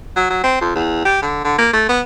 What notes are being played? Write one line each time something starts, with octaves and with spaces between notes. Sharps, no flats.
F#3
F#3
C4
F2
E2
G4
D3
D3
A#3
A3
B3